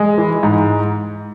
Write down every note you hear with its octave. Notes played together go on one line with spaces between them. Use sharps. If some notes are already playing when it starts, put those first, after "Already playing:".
Already playing: G#3
E3
G#2